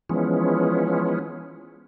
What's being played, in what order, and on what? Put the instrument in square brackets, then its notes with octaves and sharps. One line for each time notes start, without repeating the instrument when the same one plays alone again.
[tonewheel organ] E3 F3 G#3 B3 C#4